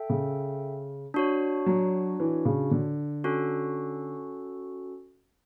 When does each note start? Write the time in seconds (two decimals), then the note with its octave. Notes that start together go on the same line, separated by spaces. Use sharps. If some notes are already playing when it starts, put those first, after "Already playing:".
Already playing: A4 E5 G5
0.10 C#3
1.14 D4 F#4 C#5
1.66 F#3
2.20 E3
2.45 C#3
2.71 D3
3.24 C#4 F#4 A4